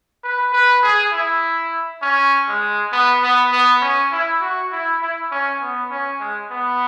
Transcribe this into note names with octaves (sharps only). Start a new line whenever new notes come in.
B4
B4
G#4
E4
C#4
G#3
B3
B3
B3
C#4
E4
F#4
E4
E4
C#4
B3
C#4
G#3
B3